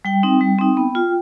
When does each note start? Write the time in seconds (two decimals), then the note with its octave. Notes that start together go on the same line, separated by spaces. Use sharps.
0.05 G3 G5
0.23 C4 D#4
0.41 G3
0.59 C4 D#4
0.77 B3
0.95 F4